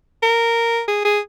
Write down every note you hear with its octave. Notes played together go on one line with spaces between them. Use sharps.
A#4
G#4
G#4